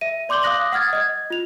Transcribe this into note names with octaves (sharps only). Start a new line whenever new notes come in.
E5 D#7
D5 C6 D6 G6 F#7 G7
F5 D6 D#6 F#6 A#6 F#7
F#5 D#6 F6 G#6 A6
D#5 G#6
F4 F7